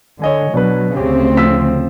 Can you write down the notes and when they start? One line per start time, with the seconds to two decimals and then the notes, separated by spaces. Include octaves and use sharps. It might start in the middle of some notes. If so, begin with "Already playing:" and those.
0.22 D3 C#5 D#5 G#5
0.54 B2 F#3 D4 B4
0.97 D2 C#3 C4 G4
1.37 F3 E6 B6